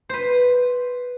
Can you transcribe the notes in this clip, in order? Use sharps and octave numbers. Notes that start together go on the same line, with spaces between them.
B4 C5